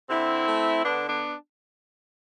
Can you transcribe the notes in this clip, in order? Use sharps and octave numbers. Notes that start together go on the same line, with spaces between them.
D3 C4 E4
A3
D3 B3 D4
B3 D4